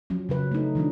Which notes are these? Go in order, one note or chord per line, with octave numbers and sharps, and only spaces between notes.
F3 F#3 C#4
C#3 F#3 B4
A3 D#4
D#3 F3 F#3 D4